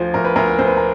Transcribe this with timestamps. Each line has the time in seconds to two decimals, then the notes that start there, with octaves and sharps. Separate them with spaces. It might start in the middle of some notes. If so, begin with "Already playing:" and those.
Already playing: D2 F3 C5
0.14 D2 A#4
0.25 B4
0.36 D2 A#4
0.59 D2 C5
0.67 B4
0.77 A#4